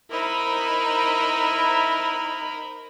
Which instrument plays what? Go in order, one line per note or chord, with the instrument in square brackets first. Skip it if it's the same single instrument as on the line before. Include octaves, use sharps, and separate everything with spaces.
[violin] D#4 C5 [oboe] E4 [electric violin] A#4 B5